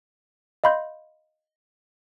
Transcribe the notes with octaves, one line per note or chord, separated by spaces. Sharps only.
D#5 F5 B5 C6 G6